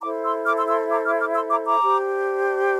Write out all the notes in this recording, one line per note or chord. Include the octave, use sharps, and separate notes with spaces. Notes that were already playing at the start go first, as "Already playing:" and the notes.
E4 A4 C5 A#5 D6
C6 E6
D6 F6
C6 E6
C6 E6
A#5 D6
D6 F6
D6 F6
C6 E6
A#5 D6
A#5 D6
D4 G4 C5